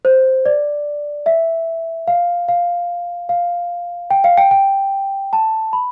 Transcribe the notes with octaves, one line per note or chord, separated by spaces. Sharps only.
C5
D5
E5
F5
F5
F5
G5
F5
G5
G5
A5
B5